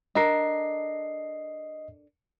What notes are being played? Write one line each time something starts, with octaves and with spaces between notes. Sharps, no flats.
D4 A4 A#4 D#5 C7